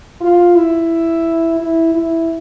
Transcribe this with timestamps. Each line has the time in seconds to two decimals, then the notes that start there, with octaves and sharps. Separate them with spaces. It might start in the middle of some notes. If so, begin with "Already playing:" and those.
0.21 F4
0.56 E4
1.59 E4
1.95 E4